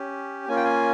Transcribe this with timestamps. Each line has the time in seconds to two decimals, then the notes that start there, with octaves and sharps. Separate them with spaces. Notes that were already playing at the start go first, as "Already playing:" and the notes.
Already playing: C#4 G4
0.48 A#3 C#4 F4 G#5
0.56 G5
0.65 G#5